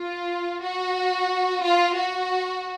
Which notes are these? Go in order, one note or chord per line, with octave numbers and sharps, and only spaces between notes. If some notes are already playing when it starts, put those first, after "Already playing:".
Already playing: F4
F#4
F4
F#4